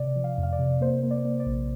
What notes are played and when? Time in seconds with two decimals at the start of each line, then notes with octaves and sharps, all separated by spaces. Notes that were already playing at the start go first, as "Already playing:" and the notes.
Already playing: C3 D5
0.16 F3
0.24 F5
0.38 F2
0.43 F5
0.53 D5
0.59 C3
0.81 A#3 C5
1.03 A#3
1.11 D5
1.25 A#3
1.40 D5
1.46 A#1